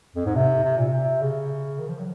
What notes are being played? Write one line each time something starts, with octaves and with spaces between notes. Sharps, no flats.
F2
G#2
C3
C3
A#2
C3
C#3
D#3
F3
F#3